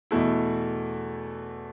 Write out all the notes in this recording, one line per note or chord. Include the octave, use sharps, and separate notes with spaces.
E2 B2 A3 E4